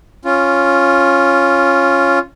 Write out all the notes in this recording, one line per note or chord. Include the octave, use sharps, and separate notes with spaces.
C#4 F4